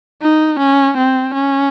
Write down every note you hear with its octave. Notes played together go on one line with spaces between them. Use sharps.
D#4
C#4
C4
C#4